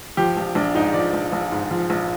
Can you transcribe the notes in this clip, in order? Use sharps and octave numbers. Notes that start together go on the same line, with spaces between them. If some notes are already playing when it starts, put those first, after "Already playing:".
F3 G4
A#1
A#1 D4
G#2 D#4
F3 D5
A#1
A#1
G#2
F3
A#1